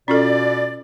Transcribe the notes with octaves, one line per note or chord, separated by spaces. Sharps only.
B2 C#4 F4 A4 D5